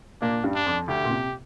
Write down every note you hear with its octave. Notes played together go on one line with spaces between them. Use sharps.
A#2 A#3 D4
G2 G3
D4
F2 F3
D2 D3 G4
A#2
C3